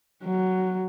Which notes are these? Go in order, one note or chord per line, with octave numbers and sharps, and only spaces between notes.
F#3